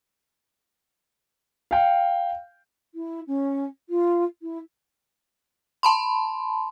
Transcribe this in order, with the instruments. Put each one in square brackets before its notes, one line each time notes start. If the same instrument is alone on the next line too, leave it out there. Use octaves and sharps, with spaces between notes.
[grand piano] F5 G5
[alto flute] E4
C#4
F4
E4
[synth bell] A5 B5 C6